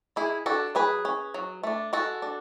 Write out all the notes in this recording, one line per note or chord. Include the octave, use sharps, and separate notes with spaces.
G#3 E4 G#4
D4 F#4 A4
F#3 G#4 B4
C#4
F#3
A3 D4
G#3 F#4 A4
D4